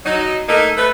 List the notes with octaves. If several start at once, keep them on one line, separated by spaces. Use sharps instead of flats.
F#3 D#4
A3 A#3 D#4 A4 A#4
A3 B4